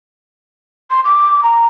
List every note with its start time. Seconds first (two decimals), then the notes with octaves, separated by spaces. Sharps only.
0.90 C6
1.05 D6
1.43 A#5